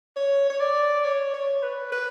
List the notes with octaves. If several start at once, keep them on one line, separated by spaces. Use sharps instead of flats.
C#5
C#5
D5
C#5
C#5
B4
B4